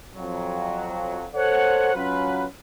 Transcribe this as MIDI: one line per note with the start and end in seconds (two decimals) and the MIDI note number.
0.14 1.27 41
0.14 1.27 54
1.34 1.92 69
1.34 1.92 72
1.34 1.92 73
1.34 1.92 78
1.94 2.45 54
1.94 2.45 61
1.94 2.45 65
1.94 2.45 71